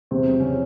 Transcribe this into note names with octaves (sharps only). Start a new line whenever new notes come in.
E2 C3 C4
F3
C#3 C#4